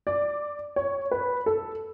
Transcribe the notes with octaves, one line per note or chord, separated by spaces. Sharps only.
D5
C#5
B4
A4